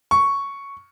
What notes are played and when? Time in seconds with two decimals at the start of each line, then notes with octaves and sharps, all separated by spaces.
0.11 C#6